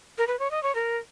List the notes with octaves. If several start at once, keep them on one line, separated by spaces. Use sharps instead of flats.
A#4
B4
C#5
D#5
C#5
A#4